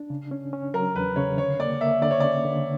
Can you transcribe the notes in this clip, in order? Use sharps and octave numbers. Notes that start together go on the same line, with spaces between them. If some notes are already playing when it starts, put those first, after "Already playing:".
Already playing: D4
C#3
C#4
C#4
F#3 A#4
E2 B4
C#3 C#5
D3 C#5
A#3 D5
A#3 E5
D3 D5
C#5
C#4 D5
D3